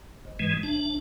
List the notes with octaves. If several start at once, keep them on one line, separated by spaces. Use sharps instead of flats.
G#1
G#2 E3 G#3
A1 D4